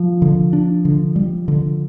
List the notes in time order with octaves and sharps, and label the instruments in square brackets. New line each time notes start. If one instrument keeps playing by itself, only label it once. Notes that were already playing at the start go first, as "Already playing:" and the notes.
Already playing: [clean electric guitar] F3
[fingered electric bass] D3
D4
D3
G3
D3